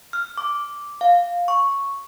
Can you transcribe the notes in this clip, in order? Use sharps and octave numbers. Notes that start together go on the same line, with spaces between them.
F6
D6
F5
C#6